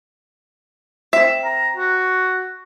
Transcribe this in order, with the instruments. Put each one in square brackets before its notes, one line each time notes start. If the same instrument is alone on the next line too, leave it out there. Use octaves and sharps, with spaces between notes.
[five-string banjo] C4 E5
[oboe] A#5
F#4